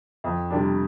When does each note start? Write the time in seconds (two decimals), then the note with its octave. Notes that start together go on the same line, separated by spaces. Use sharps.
0.24 F2
0.51 C3 G3 D4